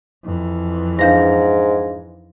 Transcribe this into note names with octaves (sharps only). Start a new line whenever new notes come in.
F2 E3
G#2 D4 F5 A#6